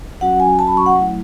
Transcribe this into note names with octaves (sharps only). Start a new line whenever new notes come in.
F#3 C#4 F#4 F#5
G#5
A5
B5
C#6
F#5
F#3 A3 E4